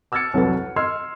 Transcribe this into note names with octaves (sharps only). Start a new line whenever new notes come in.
D6 E6 F6 G#6 A6 C#7
C2 F2 F#3 A4 B4 A6
F#5
D#5 C6 E6 F6 G#6 C7